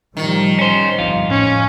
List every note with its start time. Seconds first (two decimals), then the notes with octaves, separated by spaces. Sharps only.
0.17 A2 D#3 F3 G3
0.59 C#4 C5
0.99 G1 F2 F4
1.30 A1 C#4